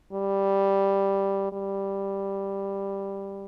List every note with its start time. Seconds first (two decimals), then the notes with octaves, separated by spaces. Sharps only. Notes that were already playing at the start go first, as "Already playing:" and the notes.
0.13 G3
1.52 G3